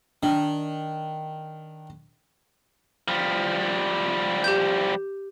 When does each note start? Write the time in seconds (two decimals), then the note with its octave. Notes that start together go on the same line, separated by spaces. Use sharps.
0.23 D#3 D4
3.08 F3 G3
4.44 G4 G6